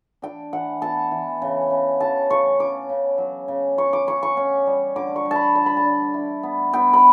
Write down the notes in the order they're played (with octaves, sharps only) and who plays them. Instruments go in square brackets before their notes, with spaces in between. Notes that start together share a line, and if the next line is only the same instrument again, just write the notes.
[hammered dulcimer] D4 G5
E3 F#5
B3 A5
E3
C#3
C#3
C#3 A5
C#3 C#6
C#4 D6
C#3
F#3
C#3
C#4 C#6
D6
C#4 C#6
C#6
C#4
G3
D3 D6
C#6
G3
A5 B5
D3 A5
B5
A5
D4
E4
B3
B3 G5
B5